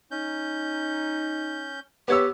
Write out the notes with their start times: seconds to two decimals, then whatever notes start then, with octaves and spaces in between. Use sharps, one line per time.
0.11 C#4 D#4 G6
2.08 B3 G4 C#5 E6